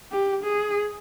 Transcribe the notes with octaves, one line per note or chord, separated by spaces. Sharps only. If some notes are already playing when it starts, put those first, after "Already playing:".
G4
G#4